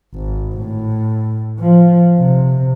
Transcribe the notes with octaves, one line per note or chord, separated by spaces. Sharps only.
G#1
A2
F3
C3